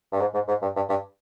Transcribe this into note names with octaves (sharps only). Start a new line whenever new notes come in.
G2
G#2
G#2
G#2
G2
G2
G2